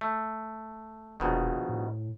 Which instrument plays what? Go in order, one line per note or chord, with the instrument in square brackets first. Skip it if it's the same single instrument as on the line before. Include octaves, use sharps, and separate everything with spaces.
[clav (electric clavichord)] A3
[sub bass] E1 [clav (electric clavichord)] A#1 B2 D#3
[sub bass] A2